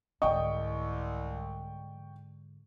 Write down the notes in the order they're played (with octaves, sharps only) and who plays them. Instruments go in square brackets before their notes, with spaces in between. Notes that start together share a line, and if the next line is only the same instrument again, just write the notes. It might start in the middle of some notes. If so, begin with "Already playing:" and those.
[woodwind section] C2 [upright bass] G#2 D3 [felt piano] D5 G5 C#6 [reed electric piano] D#5